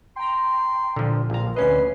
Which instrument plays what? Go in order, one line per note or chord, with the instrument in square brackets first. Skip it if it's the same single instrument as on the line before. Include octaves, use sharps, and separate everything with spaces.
[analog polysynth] G5 A#5 [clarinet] C6
[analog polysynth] A#2 [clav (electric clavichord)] D3 F3
[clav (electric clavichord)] A#1 A#5 [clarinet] F4 [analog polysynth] F5
[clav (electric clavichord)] D2 C#4 D#5 [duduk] B4 [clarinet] E5 [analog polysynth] C7